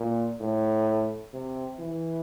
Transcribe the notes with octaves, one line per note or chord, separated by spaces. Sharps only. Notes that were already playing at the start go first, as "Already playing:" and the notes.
Already playing: A#2
A2
C3
E3